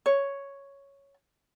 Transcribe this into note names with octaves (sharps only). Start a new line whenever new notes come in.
C#5